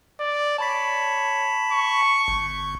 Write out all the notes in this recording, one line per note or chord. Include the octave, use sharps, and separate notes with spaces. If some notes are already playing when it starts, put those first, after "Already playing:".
D5
C#5 A5 B5 B6
C#6
G1